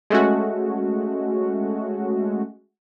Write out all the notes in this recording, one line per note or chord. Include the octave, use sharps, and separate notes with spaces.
G#3 A3 C#4 F#4